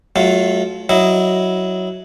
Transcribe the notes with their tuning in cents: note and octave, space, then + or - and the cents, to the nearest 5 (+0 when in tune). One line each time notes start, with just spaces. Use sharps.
F#3 +15 A3 -30 F4 +0
F#3 +0 E4 -15 D#5 +0